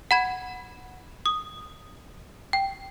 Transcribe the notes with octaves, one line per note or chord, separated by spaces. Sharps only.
F#5 B5 G#6
D#6
G5